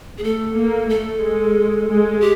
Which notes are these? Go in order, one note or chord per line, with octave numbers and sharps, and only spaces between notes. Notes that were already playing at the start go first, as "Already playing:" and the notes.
G#4
A3 A4
A#3
A3 A4
G#3
G#3
G4